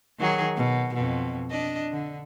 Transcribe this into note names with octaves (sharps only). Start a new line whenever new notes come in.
D#3 F#3 G#4
B2
F2 B2
D4 D#5
D3